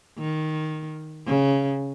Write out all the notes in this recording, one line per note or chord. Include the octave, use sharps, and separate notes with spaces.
D#3
C#3